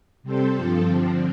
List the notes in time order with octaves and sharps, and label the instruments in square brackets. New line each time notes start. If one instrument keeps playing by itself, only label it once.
[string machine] C3 G3 C4 A4 C5
G2 F3 C4 F4 A4
D3 F3 C4